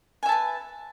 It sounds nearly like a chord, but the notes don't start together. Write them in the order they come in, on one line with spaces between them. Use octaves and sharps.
G#5 E5 A5 B4